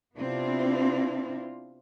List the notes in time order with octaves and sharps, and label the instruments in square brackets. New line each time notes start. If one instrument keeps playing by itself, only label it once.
[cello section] C3 B3 C4 D4 E4 F4